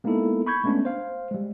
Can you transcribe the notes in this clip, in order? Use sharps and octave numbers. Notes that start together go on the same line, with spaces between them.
G#3 A#3 B3 D#4 E4 A4
B5 C#6 G6 G#6
G#3 A3 B3 C#4 D4
C5 F5
G3 G#3